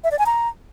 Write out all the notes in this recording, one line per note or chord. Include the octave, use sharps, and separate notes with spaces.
E5
D5
G#5
A#5